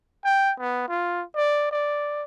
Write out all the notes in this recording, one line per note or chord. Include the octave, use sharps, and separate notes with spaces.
G5
B3
F4
D5
D5